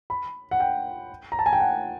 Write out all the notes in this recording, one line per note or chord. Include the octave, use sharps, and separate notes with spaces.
B5
F#5
G5
A#5
A5
G#5
G5
F#5